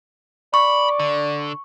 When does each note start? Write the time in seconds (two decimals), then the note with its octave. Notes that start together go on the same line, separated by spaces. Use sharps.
0.54 D5 B5 C#6
0.99 D3